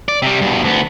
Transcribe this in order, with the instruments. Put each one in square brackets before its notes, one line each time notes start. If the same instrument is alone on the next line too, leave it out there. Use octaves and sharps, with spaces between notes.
[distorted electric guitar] D5
C3 G3
G2 B2
D2 B3